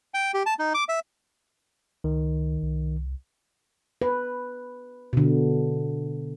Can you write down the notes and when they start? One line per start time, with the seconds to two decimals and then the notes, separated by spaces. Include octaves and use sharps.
0.14 G5
0.34 G4
0.46 A5
0.59 D#4
0.74 D6
0.89 E5
2.04 C#2 D#3
2.63 C2
4.02 B4
5.13 B2 D3